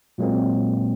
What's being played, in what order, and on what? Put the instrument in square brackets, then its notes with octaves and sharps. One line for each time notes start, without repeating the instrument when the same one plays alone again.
[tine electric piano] A#2 F#3 G#3 A#3 C4